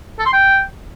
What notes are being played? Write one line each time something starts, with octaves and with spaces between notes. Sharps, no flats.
A4
C6
G5